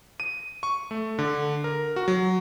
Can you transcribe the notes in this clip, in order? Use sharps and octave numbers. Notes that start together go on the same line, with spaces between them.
D#7
C#6
A3
D3
A#4
F#4
F#3